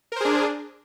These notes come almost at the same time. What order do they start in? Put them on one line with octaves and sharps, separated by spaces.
A#4 C5 G#4 D4